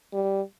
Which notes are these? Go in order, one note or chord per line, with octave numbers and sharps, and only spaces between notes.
G3